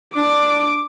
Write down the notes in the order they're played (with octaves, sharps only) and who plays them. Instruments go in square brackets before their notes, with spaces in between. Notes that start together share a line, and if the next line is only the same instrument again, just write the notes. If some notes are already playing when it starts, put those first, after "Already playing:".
[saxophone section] D4 [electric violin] D6